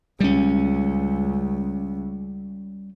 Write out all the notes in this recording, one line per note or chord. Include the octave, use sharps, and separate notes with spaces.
C#2 G3 C#4